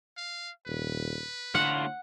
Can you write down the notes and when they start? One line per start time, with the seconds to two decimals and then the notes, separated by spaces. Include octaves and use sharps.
0.17 F5
0.67 D#1 B4
1.55 A2 D3 F4 F#5